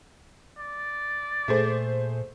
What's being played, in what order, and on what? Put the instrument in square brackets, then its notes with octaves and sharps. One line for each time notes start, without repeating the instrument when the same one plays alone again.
[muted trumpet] D5
[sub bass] A#2 [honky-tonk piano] A3 G#4 C5